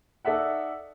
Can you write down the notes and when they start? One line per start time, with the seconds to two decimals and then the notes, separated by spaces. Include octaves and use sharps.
0.25 D#4 A4 D5 E5 F#5